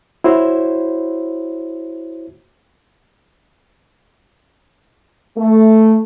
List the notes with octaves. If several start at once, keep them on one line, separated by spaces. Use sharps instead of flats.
E4 F#4 C5 C#5
A3